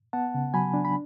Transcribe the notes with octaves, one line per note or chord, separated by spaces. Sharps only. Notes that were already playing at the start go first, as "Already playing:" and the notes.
B3 F#5 A5
C#3
F#3 G#5 B5
D4
B5